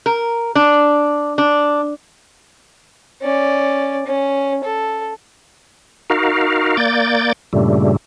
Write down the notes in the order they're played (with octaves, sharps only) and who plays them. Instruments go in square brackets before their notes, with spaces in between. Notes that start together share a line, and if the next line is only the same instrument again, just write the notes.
[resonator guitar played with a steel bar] A#4
D4
D4
[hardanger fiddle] C#4 D5
C#4
A4
[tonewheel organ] D#4 F#4 A#4 F5
A#3 D5 G6 A6
G2 A#2 C#3 G3 A3